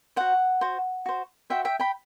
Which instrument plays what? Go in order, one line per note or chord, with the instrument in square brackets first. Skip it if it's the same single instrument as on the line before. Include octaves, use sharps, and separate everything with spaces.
[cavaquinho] F#4 C5 F#5
F#4 C5
F#4 C5
F#4 C5 E5 G5
E5 G5
G5 B5